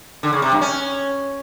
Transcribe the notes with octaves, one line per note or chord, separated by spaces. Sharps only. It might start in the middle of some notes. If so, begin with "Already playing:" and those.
D3
C#3
C3
G2
C#4